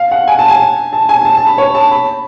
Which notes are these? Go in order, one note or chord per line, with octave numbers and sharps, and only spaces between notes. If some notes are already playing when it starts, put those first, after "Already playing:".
Already playing: F5
F#5
G#5
A5
G#5
A5
G#5
A5
A5
B5
C#5
A5
B5